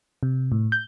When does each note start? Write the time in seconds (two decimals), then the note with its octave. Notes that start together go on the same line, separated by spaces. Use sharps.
0.23 C3
0.52 A2
0.72 G6